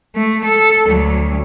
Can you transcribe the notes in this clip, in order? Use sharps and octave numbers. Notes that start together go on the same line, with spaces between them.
A3
A4
D2 F#3